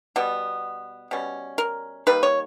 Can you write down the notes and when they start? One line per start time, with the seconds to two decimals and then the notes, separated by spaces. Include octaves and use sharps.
0.16 B2 G3 B3
1.11 B2 G3 C#4
1.58 A#4
2.07 D#3 G3 A#3 B4
2.23 C#5